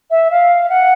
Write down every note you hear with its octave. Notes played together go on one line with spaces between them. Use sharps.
E5
F5
F#5